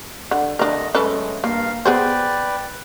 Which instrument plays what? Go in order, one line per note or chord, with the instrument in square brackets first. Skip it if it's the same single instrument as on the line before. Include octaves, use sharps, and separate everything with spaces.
[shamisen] D3
[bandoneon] D3 A3 D#5 [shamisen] D4 A#4
[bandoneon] F#3 G#3 A3 [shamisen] C#4 A4 B4
[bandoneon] G2 A#4 F5 [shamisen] A#3
[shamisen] B3 G#4 C5 [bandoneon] B4 D5 G5